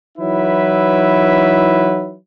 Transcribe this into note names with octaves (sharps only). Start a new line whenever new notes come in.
E3 F#3 D#4 E4 B4 E5